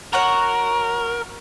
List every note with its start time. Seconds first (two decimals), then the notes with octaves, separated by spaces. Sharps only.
0.13 F#4 A#4 C#5 F#5